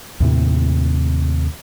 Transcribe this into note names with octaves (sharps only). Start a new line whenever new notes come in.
D#2 A2 C3